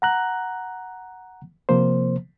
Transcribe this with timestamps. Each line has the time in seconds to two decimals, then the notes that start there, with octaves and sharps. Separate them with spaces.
0.02 F#5 A#5 F#6
1.69 C3 F3 A#3 C5